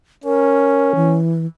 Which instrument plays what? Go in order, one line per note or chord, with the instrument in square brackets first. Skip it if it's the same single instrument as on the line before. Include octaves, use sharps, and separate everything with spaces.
[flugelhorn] C#4 [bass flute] A#4
[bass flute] E3